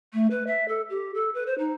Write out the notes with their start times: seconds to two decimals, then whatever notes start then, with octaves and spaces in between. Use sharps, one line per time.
0.14 A3
0.31 B4
0.47 E5
0.68 A4
0.90 G4
1.14 A4
1.34 B4
1.47 C5
1.58 D#4